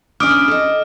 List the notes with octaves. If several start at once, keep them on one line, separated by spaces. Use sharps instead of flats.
C#4 D4 E4 D6 D#6 F6 D7
A4 D#5